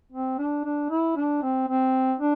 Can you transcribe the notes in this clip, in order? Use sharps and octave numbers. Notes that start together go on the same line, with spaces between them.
C4
D4
D4
E4
D4
C4
C4
D4